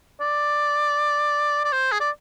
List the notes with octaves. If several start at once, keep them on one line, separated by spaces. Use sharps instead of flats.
D5
D5
C5
G#4
D5